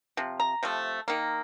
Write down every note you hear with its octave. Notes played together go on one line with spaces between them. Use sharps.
C3 F3
A#5
C3 F3 A3
D#3 A#3